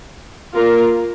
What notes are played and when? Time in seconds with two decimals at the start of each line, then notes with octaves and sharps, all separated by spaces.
0.54 A#3 F4 A#4